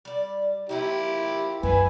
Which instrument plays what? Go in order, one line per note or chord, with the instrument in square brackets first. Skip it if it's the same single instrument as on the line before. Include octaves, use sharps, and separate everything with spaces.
[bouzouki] G3 D5
[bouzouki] F3 A#3 F4 [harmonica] E4 G4
[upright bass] F#2 [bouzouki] G3 [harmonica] B4 G#5